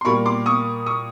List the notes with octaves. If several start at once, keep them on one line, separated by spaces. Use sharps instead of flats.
C6
A#2 G3 A#3 B5 C#6
C6 D6
C#6 D#6
C#6 D#6